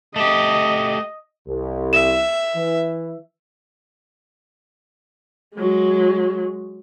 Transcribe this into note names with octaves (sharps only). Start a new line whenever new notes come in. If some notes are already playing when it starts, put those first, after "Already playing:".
A3 G4 D#5
C2
E5 E7
E3
F#3 G#3